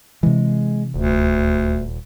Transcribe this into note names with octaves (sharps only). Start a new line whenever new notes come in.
C3 E3 G#3
D#1 D2